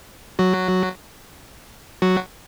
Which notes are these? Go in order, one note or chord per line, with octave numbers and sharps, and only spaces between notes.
F#3 F#4
F#3 F#4